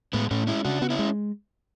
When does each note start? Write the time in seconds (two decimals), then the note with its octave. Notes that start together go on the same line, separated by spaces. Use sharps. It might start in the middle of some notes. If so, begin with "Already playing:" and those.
0.13 A2 G#3 B3
0.31 A2 A3 C#4
0.47 G#3 C#4 E4
0.65 C#3 D4 F#4
0.81 B3 F#4
0.90 C#4 E4
0.99 G#3